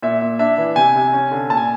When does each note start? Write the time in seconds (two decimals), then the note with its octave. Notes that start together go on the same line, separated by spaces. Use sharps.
0.03 A#2 E5
0.21 A#2
0.39 D4 E5
0.58 E3
0.76 C3 G#5
0.96 C3
1.13 C#4
1.31 D3
1.50 A#2 A5
1.57 G#5